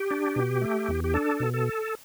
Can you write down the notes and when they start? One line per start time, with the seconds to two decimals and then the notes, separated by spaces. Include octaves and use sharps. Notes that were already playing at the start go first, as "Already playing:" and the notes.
Already playing: G4
0.11 D4
0.36 B2
0.62 A3
0.88 E2
1.04 G4
1.14 D4 A4
1.40 B2
1.54 A4